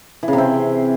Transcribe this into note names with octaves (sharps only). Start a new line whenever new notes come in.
E3
C#3
C3
C4